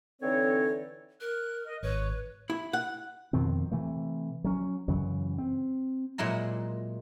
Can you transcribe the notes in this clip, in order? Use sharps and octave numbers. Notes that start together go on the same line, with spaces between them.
D3 E3 C4 D#4 A4 C#5
A#4 F#6
D#5
G#1 B4 C#5
E4
F#5
F2 B2 D#3 C4
C3 E3 A3
F#3 C#4
F#2 C#3 E3 F#3
C4
A#2 F#3 G#3 E4 A#5